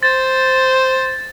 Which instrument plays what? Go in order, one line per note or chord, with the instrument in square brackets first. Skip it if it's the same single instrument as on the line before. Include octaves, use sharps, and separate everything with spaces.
[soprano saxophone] C5 [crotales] A6